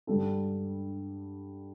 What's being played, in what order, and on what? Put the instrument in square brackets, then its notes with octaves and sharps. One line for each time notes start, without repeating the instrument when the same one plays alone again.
[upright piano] G2 D3 G3 D4 A4